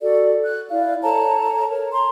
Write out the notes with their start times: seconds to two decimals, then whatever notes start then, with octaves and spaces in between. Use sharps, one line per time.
0.01 F#4 A4 D5
0.43 F#6
0.71 E4 D5 F5
1.03 A4 C#5 A5 A#5
1.70 A#4 C#5
1.93 A#5 C6